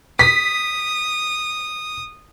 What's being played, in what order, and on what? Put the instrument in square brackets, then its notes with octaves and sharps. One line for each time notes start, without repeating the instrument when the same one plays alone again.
[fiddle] D#6 [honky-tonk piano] B6